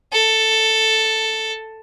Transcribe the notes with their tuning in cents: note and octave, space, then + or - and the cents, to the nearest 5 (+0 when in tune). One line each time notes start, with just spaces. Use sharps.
A4 +5